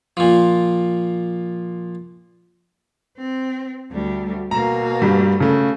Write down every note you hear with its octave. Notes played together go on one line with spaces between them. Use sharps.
A#2 F3
C4
D2 G3
B2 A#3 A#5
G2 G3
C#3 A3